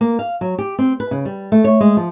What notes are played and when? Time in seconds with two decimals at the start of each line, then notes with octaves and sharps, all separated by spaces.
0.01 A#3
0.19 F5
0.41 F#3
0.58 G4
0.79 C4
1.00 B4
1.11 C#3
1.25 G3
1.52 A3
1.64 C#5
1.80 G#3
1.97 F3